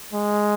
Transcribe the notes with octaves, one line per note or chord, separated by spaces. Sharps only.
G#3